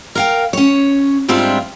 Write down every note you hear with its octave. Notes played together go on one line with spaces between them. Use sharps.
A#4 F5 G5
C#4 C#5
G#2 G3 C4 D4 E4 F4